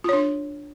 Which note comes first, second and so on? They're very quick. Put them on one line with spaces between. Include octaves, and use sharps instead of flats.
F4 C#5 D4